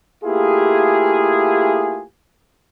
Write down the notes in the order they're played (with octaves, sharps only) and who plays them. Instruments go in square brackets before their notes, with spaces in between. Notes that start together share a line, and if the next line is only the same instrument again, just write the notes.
[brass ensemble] A3 A#3 E4 F4 G4 G#4